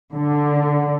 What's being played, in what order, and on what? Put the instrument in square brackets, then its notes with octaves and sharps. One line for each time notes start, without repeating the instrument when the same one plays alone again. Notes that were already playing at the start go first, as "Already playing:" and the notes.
[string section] D3